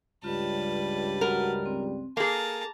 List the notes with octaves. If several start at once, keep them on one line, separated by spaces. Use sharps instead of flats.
C#2 G2 G3 F4 B4 A5
F#4 A#4 F#5
C4
A#3 G#4 A4 A5 A#5